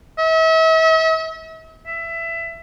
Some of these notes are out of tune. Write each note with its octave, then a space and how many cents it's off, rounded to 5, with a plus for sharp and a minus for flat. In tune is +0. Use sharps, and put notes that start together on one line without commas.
E5 -40
E5 +20